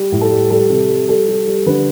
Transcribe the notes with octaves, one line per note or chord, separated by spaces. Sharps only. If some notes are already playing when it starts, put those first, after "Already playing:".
Already playing: G3
A2
A4
G3
G3 A4
C3
G3
G3 A4
G3
G3
D3 B4